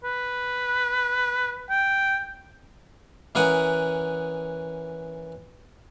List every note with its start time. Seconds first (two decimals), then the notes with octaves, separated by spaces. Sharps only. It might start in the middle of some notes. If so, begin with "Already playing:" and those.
0.04 B4
1.69 G5
3.35 E3 C#4 A#4 F#5 D#6